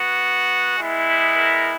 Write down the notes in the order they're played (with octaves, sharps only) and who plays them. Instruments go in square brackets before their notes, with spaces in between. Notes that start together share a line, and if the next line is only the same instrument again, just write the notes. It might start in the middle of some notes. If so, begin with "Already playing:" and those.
Already playing: [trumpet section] B3 F#4
G#3 B3 E4
A#4